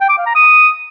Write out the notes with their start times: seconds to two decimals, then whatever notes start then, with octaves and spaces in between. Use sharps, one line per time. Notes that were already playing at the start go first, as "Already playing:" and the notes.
0.01 G5
0.09 D6
0.18 F5
0.27 A#5
0.35 D#6